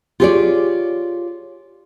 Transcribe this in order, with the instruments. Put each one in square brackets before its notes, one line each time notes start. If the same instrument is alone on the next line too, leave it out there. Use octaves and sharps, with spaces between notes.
[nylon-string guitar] F4 G4 G#4 B4 C#5 D5